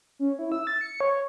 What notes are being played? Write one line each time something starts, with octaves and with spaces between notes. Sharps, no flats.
C#4
E4
E6
A6
C#7
C#5